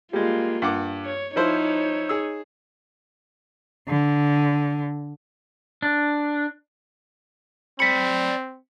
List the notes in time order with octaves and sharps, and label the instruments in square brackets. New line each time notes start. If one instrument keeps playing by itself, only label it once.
[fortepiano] G3 G#3 [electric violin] A#3 F4
[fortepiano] G2 F#5 D6
[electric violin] C#5
[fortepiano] F3 E4 C5 [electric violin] D#4 C#5
[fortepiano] G#4 E6
[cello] D3
[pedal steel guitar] D4
[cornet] C4 [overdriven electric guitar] D5 B5 [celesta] B6 C#7